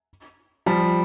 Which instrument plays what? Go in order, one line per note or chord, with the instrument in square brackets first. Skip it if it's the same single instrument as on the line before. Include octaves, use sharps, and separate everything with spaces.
[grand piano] F3 G3